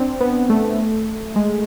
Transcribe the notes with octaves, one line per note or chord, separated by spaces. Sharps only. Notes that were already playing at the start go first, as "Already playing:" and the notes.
Already playing: C4 D4
B3
A3
G#3